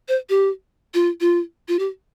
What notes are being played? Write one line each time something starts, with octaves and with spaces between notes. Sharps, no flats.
C5
G4
F4
F4
F4
G4